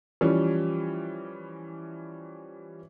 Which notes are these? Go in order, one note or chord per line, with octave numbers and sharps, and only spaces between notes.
E3 F3 G3 C#4